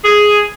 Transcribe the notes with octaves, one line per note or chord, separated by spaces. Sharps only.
G#4